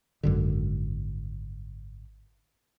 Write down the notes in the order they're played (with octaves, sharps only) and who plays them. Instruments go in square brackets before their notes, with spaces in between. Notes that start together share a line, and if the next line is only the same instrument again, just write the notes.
[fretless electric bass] G#1 F#2 D3